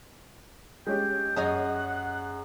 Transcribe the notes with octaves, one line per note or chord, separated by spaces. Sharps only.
G#3 C#4 G4 G5
F#2 G#4 C#5 D#5 F#5